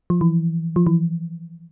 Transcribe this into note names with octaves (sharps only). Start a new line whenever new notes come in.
F3
E3
F3
E3